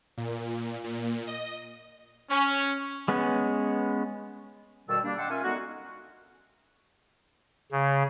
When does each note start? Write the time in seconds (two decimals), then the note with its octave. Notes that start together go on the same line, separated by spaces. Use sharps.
0.18 A#2
0.84 A#2
1.27 D#5
2.30 C#4
3.08 G#3 B3 C#4
4.89 F2 B2 D#3 G3 A5 E6
5.04 G3 A#3 D4
5.18 D#5 F#5 G5 A5 C6 E6
5.30 A#3 C#4 F4 E5 F5 G#5
5.44 D3 G#3 B3 D#4 F#4
7.72 C#3